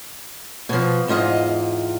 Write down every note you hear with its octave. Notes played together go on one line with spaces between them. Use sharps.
B2 F3
E2 G#2 F4 D#5